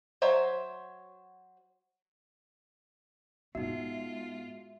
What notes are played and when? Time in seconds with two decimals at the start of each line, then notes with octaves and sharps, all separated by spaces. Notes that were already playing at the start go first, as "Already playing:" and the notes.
0.22 F#3 C5 C#5 E5
3.55 A2 G#3 B3 D#4 F4 F#4 E5